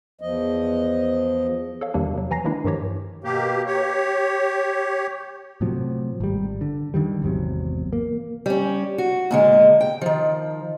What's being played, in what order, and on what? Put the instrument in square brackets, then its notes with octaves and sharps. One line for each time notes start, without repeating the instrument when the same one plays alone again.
[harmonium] E2 F3 D#5
[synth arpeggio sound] A4 C#5 F5
E2 C3 D#3 G3 A#3 D4
C3 F#3
E3 G#5 A#5 A#6 C7
D#3 E3 G#3 A#3 D4 E4
G2 D#3 F3 G4 C#5
[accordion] B2 A#3 G4
G4 C#5
[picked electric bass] A2 C3 F3 F#3
G#1 G3
D3
D3 D#3 F3 G3
G#1 E2 C3 F#3
A#3
[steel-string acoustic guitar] G3 C#4
F#4
A#2 D3 G#3
G5
D#3 F3